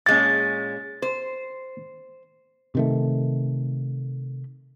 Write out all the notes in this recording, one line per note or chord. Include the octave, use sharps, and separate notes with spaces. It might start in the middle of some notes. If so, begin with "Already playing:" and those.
A#2 G#3 C#4 A6
C5
C3 D#3 A3